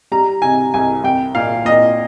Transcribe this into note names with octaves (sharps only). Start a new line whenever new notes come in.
G3 A#5
C3 G#5
C2 G#5
C2 G5
A#2 F5
A#2 D#5